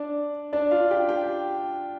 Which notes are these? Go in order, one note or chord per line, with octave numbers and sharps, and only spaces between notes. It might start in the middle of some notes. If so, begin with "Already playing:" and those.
Already playing: D4 D5
D4 D5
F4 F5
G4 G5
G4 G5